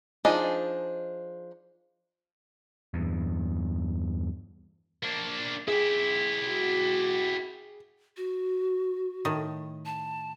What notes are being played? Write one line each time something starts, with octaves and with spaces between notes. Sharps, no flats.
F3 D4 D#4 G#4 D#5
E2 G2
A#3 D4
E4 G4 G#4
F#4
F#4
A2 D#3
A5